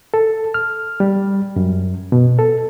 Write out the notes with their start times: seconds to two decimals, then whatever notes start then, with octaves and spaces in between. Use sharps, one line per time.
0.14 A4
0.54 F6
1.00 G3
1.56 F#2
2.12 B2
2.39 A4